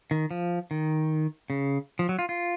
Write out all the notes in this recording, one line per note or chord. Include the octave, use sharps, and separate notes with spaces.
D#3
F3
D#3
C#3
F3
F#3
F4
F4